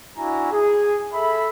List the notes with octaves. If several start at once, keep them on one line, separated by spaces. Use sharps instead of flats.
D4 E4 F#4 G#5 A#5
G#4
A4 E5 B5